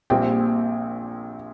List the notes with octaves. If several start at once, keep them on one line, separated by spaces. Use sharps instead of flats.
A#1 A#2 G3 C4 G5